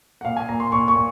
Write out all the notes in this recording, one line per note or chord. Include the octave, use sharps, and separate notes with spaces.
F#5
A#2 F5
G#5
A#2 A#5
C6
A#2 C#6
C#6
A#2